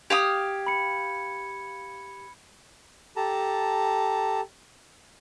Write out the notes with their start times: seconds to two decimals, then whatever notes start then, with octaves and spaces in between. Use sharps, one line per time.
0.10 G4 F5 D#6 G#6
0.67 B5 C#7
3.16 G4 A4 A5 A#5